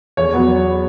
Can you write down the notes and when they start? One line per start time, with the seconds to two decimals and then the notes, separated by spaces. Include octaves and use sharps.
0.17 E2 C#5
0.34 F#3 B3